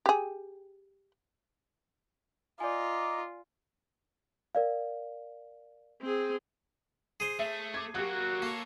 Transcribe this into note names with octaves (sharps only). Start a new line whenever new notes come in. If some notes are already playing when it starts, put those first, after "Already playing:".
G4 G#4
F4 D5 D#5 G#5 A#5 D6
A#4 D5 F5
C4 G#4
G#4 C5
A3 E5
D6 G#6
F#3 A#3 F#4 G4 F#6
A#3 A4 C#5